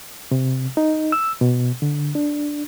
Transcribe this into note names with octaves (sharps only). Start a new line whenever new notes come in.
C3
D#4
E6
B2
D3
D4